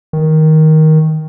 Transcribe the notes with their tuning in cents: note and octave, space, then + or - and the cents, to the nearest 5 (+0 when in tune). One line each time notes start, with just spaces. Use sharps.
D#3 +10